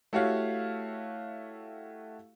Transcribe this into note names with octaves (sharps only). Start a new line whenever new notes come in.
A3 E4 F#4 G4 C#5 F5